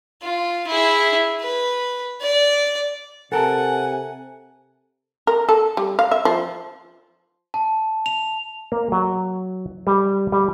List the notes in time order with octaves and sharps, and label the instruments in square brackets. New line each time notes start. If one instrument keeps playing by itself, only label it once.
[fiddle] F4
E4 G#4
B4
D5
[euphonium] C3 [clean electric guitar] A4 A#4 A5 [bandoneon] F#5 [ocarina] G#5
[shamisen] A#4
A4
G3
F5
E5
F3
[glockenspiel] A5
F7
[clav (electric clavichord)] A#3
F#3
G3
G3